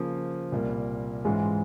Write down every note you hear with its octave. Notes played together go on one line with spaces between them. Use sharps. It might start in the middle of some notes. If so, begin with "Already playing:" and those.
Already playing: C#3 F3 A#3
C2 A#2 G3 A#3
G#2 E3 G#3 C#4 F4